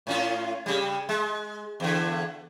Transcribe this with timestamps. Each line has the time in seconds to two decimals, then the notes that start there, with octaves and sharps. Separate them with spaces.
0.07 A2 C#4 F4
0.66 C#3 G3
1.09 G#3
1.80 E2 D3